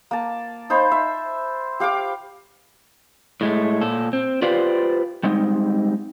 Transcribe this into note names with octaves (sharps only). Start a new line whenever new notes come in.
A#3 A5
D#4 C5 F5 B5
E5
G4 F5 G5 D6
A2 G#3 A3
A#2 A4
C4
F4 G4 B4 C5 D5 F5
G3 G#3 C4 D#4